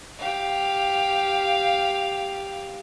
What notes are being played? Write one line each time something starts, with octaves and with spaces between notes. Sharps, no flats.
G4 F5